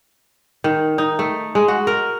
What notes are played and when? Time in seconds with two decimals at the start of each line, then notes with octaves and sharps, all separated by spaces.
0.64 D#3
0.98 D#4
1.19 A3
1.55 G#3
1.68 F#4
1.87 A#4